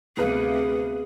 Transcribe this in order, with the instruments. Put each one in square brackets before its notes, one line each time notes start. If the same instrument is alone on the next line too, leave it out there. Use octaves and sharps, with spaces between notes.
[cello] D2 C3 [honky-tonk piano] B3 B4 F5 [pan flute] G#4